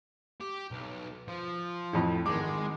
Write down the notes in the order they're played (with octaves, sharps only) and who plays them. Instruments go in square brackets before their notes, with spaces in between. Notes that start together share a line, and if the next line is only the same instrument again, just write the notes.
[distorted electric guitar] G4
B1
F3
[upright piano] F2 A2
[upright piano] G#1 D6 [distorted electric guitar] G#3